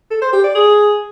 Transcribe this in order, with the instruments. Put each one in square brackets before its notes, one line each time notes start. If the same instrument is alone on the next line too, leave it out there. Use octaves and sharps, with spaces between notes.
[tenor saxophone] A4
C5
G4
D5
G#4